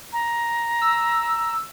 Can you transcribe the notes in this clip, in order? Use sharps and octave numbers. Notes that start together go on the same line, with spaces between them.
A#5
E6